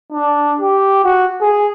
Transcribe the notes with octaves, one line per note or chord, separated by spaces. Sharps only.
D4
G4
F#4
G#4